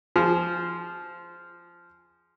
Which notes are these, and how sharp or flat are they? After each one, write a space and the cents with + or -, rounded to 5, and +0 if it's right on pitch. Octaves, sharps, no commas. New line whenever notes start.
F3 -15 G#4 +0